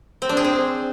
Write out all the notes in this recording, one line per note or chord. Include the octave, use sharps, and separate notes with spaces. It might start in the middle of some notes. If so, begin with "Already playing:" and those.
C4
D4
G#4
C4